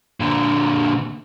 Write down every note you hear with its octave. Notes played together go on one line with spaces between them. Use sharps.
A#2 D3